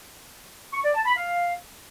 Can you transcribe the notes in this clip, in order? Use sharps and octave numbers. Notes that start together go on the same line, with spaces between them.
C#6
D5
A5
B5
F5